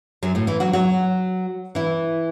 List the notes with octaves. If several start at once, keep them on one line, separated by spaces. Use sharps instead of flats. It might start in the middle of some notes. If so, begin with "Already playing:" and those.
F#2 F#3
A2 A3
E3 E4
F#3 F#4
F#3 F#4
E3 E4